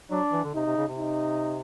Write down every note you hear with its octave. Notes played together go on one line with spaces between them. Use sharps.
F#3 D4
E3
D3
C3 D#4
C3
C#3
C3
D#4